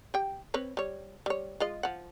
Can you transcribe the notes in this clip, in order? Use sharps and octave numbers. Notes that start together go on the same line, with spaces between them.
G4 G5
C4 B4 C#5
G3 C#5
G3 C#5
G#3 F4 D#5
F3 F#5